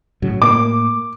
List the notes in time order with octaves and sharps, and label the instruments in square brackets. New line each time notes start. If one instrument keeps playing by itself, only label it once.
[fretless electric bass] A2 C#3 F#3
[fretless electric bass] A2 A#3 [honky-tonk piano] D6